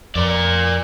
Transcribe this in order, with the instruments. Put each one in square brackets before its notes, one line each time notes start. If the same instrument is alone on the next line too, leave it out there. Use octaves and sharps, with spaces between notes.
[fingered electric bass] F2 [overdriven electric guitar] A#4 D5